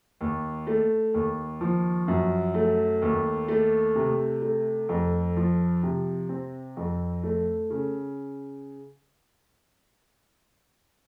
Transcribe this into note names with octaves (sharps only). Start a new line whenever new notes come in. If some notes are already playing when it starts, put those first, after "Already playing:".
D#2
A3
D#2
F3
F#2
A3
D#2
A3
C3
A3
F2
F3
C3
C4
F2
A3
C#3